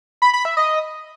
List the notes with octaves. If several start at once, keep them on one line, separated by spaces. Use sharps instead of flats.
B5
B5
E5
D#5